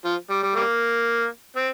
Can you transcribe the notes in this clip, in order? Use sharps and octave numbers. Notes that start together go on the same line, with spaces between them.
F3
G3
G3
G3 A#3
C4